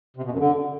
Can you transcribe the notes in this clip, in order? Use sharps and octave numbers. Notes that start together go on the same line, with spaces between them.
C3
B2
F#2
D3